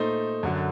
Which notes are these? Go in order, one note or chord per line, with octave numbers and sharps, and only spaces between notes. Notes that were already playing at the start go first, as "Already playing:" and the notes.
Already playing: A#2 A3 D#4 A4 C5
F#2 D3 F#3